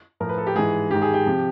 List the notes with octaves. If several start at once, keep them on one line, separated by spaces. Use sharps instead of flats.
A2 F3 A#4
B4
A4
G4
G#2 E3 G#4
G#2 D#3 G4
G#4
G4
C3 F3